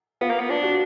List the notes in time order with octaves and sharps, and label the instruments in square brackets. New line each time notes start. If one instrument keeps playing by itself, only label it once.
[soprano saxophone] B3 [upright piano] F4
[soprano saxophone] A#3
B3
[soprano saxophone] D4 [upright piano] F4
[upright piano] F#4